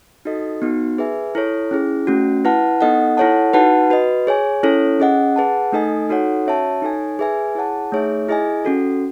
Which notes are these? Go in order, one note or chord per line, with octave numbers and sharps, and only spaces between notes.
D#4 F#4 A4 D#5
B3 D#4 F#4
G#4 B4 E5 G#5
E4 A4 C#5
C#4 E4 G#4
A3 C#4 F#4
E4 B4 F#5 A5
B3 D#4 A4 D#5 F#5
E4 A4 C#5 F#5 A5
D#4 F#4 B4 F#5 A5
F#4 B4 D#5
G#4 C#5 G#5
C#4 E4 A4 C#5
C#4 G#4 D#5 F#5
G#4 B4 F#5 A5
A3 D#4 A4 D#5 G#5
D#4 F#4 A4 C#5 F#5
C#4 F#4 C#5 E5 A5
D#4 A4 C#5 G#5
G#4 B4 E5 G#5
E4 G#4 C#5 F#5 A5
A3 D#4 G#4 C#5 E5
E4 G#4 D#5 G#5
C#4 F#4 A4